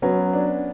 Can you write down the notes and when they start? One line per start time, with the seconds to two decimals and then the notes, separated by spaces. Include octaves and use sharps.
0.02 F#3 B3 C#4
0.33 D4